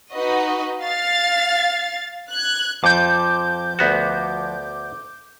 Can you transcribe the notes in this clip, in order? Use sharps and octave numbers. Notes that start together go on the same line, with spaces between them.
D#4 F#4 B4 D#5
F5 A6
F#6 G#6
F2 F3 D6 G6
D2 B3 F#4